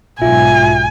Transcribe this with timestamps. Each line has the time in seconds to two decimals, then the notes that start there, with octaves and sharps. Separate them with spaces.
0.22 B1 G#2 F4 E5 G#5